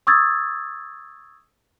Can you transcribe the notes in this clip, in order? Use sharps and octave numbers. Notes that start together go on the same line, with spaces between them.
C#6 D#6 E6 G#6 A6